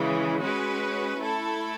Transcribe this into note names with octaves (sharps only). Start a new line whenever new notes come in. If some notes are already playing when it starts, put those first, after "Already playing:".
Already playing: C#3 E3 G#3
G#3 C#4 F#4 B4
A3 E4 A4